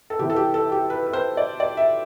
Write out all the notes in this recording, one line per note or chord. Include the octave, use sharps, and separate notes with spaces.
A4
C3 E3 B3 E4 G4
A4
G4
A4
G4
B4
B4
C5
D5
D5
E5